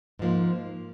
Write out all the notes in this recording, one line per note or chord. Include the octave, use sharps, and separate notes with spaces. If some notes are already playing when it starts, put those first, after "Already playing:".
G#2 F3 A#3